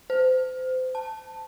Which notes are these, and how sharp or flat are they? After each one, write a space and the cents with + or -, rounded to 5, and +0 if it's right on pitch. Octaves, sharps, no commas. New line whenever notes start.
C5 -30
A5 +5